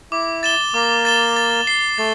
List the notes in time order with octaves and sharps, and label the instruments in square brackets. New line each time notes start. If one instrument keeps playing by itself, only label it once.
[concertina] E4 [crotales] D6
[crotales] A6 E7 G7
[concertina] A#3 [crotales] D6
[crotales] A6 E7 G7
A6
C7 G7
[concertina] A3 [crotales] A6